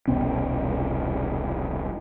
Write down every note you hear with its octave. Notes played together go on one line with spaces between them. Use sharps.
E1 C2 B3 C#4